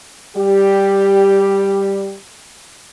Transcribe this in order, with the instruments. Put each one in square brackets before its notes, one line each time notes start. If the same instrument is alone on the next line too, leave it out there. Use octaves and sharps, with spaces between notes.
[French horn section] G3 G4